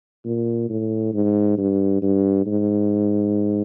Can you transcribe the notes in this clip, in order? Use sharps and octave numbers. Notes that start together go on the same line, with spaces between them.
A#2
A2
G#2
G2
G2
G#2